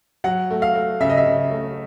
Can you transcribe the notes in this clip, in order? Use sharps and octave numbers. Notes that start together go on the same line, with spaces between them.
F#3 F#5
A3
F5
A3
C#3 E5
D#5
E5
C#3
A3